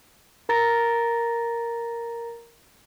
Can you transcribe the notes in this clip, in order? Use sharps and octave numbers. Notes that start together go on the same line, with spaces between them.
A#4 A#5 A6 A#6